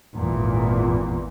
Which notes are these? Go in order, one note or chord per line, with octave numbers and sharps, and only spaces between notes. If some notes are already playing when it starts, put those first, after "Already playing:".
G#1 E2 A#2